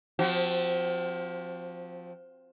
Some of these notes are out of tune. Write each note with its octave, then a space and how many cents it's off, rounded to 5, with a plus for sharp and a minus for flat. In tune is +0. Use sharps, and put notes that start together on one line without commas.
F3 +20 C4 +0 F#4 +40